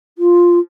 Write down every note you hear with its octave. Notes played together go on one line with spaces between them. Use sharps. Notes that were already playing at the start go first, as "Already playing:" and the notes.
F4